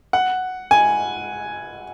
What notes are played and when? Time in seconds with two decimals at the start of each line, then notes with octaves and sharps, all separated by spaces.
0.13 F#5
0.71 G#5